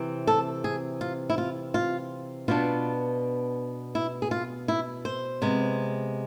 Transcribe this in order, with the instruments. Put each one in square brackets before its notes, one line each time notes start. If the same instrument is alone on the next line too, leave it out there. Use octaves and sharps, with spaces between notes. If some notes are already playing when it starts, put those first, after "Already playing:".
Already playing: [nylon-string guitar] C3 E3 C4
A4
G#4
F4
E4
F4
F4
B2 B3 D4 F4
E4
G#4
F4
E4
C5
C3 G#3 B3